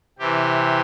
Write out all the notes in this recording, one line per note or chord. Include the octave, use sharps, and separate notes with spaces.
C3 E3 G4